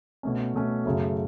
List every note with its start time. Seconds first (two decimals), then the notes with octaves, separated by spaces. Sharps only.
0.23 B2 A3 C#4
0.54 B2 A3 C#4
0.85 F#2 C#3 F#3 A3